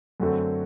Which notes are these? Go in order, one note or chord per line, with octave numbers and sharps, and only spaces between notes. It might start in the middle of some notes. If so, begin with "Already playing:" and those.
F#2 D3 A3 C4 F#4